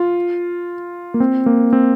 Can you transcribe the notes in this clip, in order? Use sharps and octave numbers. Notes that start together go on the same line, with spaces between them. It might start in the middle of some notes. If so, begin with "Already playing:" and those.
Already playing: F4
A#3
C4
A#3
C4